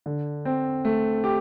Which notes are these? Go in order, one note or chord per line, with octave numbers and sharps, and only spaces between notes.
D3
C4
A3
G4